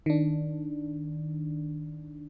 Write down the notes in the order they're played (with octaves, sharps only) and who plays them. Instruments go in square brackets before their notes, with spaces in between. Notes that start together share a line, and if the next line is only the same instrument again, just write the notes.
[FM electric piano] D#3 D4